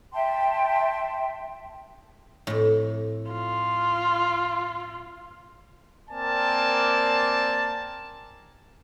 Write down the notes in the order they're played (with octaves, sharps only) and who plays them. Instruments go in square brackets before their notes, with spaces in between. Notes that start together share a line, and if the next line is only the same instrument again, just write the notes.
[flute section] E5 G5 A5 C6
[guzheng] F2 A2
[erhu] F4
[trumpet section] A#3 C4 A#4 D5 G#5 A5